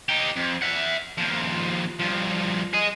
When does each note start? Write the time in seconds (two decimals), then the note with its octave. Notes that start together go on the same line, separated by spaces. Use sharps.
0.09 D#4 G4
0.36 F2
0.62 E5 F#5
1.18 D#2 F3
2.00 G2 F3
2.74 G#4 D#5